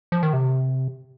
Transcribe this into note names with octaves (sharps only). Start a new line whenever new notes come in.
F3
D#3
C3